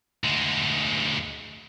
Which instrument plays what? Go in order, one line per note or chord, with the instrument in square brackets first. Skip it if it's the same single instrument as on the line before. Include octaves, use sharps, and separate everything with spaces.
[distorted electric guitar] D2 G#3